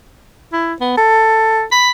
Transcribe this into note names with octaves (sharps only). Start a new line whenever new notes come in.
E4
B3
A4
B5